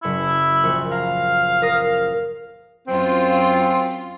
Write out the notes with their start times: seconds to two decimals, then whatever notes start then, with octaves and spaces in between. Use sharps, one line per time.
0.03 F#1 E4 C#7
0.63 A#1 C#6
0.91 F5 A#5
1.62 A#4 D#6 A#6
2.87 F#2 C4 F4